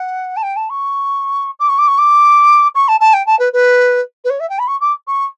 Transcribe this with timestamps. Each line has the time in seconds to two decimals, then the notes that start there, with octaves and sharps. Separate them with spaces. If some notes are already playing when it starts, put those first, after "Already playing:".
Already playing: F#5
0.37 A5
0.43 G5
0.56 A5
0.70 C#6
1.60 D6
1.69 C#6
1.78 D6
1.88 C#6
1.98 D6
2.75 C#6
2.88 A5
3.00 A5
3.14 G5
3.26 A5
3.39 B4
3.53 B4
4.25 B4
4.30 C#5
4.40 E5
4.50 G5
4.59 B5
4.68 C#6
4.81 D6
5.07 C#6